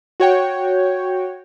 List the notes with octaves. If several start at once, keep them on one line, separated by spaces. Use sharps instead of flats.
F#4 C#5 G5